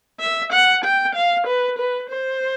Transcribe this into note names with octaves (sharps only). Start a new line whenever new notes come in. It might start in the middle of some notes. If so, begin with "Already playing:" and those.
E5
F#5
G5
F5
B4
B4
C5